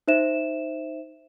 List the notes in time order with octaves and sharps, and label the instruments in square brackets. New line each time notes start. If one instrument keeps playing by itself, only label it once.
[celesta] D#4 C5 E5 E7